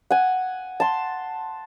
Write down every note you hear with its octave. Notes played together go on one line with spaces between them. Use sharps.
F#5 G#5
A5 C6